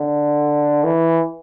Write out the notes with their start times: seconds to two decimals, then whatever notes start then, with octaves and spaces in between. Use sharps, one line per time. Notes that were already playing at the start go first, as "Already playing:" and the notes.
Already playing: D3
0.84 E3